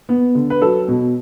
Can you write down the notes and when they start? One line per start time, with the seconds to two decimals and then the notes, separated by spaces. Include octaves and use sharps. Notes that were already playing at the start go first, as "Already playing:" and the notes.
0.09 B3
0.35 D3
0.50 B4
0.62 F#3 A4
0.88 B2